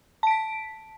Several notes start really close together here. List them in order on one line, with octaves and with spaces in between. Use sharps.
A5 D7 B6